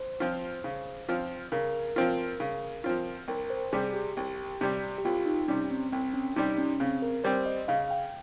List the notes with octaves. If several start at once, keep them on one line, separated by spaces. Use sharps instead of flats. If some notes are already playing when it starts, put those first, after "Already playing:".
Already playing: C5
F3 C4 F4
C#3
F3 C4 F4
C#3 A#4
F3 C4 F4
C#3
F3 C4 F4
C2 A#4
C5
C3 G3 G#4
G4
C2
C3 G3
G4
C2 F4
D#4
C3 G3 C#4
C4
C2 C4
C#4
C3 G3 D#4
C#4
C#3 C4
A#4
G3 C4 C5
D#5
C#3 F5
G5